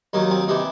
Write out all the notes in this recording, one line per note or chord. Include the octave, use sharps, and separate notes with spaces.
D#2 D#3 F#3 D#4
C4
C3 E3 D#4